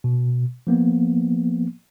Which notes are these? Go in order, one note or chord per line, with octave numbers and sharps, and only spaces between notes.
B2
F3 A#3 B3